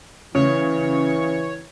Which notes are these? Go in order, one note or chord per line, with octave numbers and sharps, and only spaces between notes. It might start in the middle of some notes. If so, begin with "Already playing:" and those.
C#3 E3 C#5